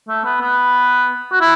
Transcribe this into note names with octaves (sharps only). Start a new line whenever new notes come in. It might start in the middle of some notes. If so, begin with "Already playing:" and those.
A3
B3
B3
F#4
E4